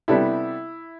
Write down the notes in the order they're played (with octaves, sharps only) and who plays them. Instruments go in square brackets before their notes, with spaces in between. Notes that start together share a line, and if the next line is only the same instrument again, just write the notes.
[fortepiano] C3 G3 B3 D4 A4 [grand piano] E4